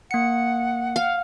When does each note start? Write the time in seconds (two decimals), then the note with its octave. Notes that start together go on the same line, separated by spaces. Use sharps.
0.11 A#3 F#5 C#7
0.96 F5